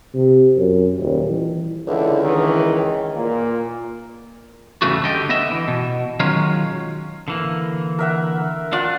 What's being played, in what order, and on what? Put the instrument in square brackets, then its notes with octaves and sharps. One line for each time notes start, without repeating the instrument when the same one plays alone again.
[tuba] C3
F#2
D#1
E3
[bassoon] C#2 [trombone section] D3 E4
[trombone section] D#3 E3
A#2 A#3
[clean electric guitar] E2 G2 C#3 E3 A3 F#4
D3 G3 D#5 G5
B3 D#5 E5
E3
B2
D#3 F#3 G#3 C#4 F4
D3 E3 A#3
[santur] A#4 E5 F#5
[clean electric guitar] D4 D5 [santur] F4 F#5